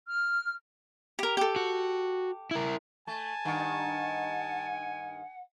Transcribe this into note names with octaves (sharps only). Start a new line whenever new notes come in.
F6
G4 A#4
G4 A4
F#4
E4 A#4
A3 G#5 A5
G2 D#3 F#5